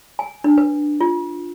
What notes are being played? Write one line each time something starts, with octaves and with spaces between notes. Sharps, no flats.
G#5
D4
B4
F4